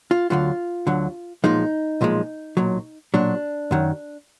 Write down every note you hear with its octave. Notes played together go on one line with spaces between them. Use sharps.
F4
D2 D3 F#3 F4
D2 D3 F#3
B1 A#2 F3 G#3 D#4
B1 A#2 F3 G#3
B1 A#2 F#3
B1 A#2 F#3 D4
F#2 D#3 F#3